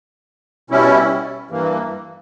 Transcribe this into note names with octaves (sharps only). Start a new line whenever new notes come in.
B2 G3 C#4 E4
G2 E3 A#3